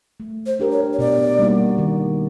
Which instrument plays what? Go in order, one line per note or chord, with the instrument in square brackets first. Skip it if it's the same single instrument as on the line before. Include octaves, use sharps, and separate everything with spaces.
[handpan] A3
[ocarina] C5
[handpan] D4 G4 A#4
[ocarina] C#5
C#5
[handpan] B2 [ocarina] D5
[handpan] G3 A#3 D#4 F#4
D#3